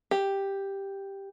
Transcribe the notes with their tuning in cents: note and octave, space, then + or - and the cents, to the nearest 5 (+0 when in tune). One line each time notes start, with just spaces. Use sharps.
G4 +5